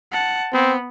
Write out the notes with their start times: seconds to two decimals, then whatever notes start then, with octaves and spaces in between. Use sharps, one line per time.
0.12 F#5 A5
0.53 B3 C4